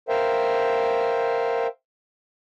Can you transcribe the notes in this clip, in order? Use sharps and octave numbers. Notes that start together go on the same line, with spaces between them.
A#4 C5 E5 F5 G5